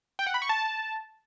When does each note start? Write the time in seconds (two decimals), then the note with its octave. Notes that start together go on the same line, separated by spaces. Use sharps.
0.19 G5
0.27 F#5
0.34 B5
0.42 C#6
0.49 A5